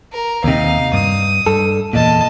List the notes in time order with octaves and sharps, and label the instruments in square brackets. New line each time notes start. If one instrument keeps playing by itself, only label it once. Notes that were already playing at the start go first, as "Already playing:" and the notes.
[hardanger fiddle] A#4
[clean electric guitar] D#2 C3 [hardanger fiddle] D#4 F5
[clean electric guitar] G2 [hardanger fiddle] D#6
[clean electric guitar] G2 A4
[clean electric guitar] E2 A#2 [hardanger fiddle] D#5 A5